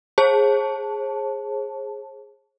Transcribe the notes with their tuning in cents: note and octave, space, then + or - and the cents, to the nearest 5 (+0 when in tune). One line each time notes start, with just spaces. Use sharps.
G#4 +0 C5 +45 A5 +0